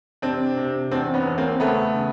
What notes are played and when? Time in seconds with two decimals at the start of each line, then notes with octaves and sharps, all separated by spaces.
0.22 C3 C4 D4
0.57 C3
0.91 E2 C4 D4
1.14 B3 C#4
1.26 E2
1.38 A#3 C4
1.60 C#3 A3 B3
1.94 C#3